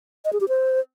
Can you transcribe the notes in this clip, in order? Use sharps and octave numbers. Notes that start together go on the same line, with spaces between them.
D#5
G#4
G4
C5